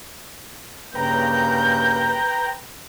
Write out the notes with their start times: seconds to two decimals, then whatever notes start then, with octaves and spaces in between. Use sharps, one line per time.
0.95 G2 C#3 A#3 B4 G5 A#5 G6